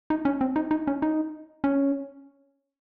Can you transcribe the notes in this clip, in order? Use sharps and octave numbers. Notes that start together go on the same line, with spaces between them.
D#4
C#4
C4
D#4
D#4
C#4
D#4
C#4